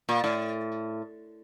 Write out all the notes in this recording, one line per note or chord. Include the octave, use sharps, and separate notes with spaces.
A#2
A2